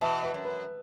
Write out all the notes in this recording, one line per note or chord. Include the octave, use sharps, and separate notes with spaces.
B2 E3 E5 A5
B4 E5
F#2
B4